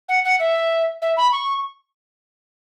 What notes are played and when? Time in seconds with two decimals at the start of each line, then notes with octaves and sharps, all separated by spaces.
0.09 F#5
0.25 F#5
0.40 E5
1.02 E5
1.17 B5
1.32 C#6